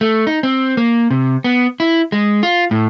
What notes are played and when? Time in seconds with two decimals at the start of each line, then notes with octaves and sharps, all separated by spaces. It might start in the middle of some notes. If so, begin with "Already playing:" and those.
0.01 A3
0.27 D#4
0.43 C4
0.77 A#3
1.11 C3
1.44 B3
1.80 E4
2.12 G#3
2.43 F4
2.71 A2